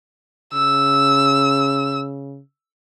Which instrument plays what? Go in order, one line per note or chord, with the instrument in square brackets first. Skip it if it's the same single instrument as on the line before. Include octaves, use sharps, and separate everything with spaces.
[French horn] C#3 [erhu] E6